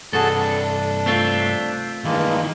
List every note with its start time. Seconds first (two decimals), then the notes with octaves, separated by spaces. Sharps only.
0.13 G2 C3 F#4 G#4 A4 A5
0.35 D4
1.06 A3 C4 F4
2.04 G2 D#3 E3 G#3 A#3